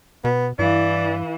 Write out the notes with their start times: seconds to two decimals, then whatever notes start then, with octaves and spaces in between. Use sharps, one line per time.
0.25 B2 B3
0.59 G2 E3 E4 D5 F5